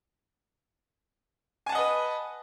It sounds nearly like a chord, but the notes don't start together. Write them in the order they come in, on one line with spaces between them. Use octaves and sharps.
G#5 A5 F#5 D#5 B4